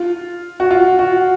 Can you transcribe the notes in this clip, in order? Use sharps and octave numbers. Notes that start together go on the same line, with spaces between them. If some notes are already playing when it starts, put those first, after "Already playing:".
Already playing: F4
F#4
F4
F#4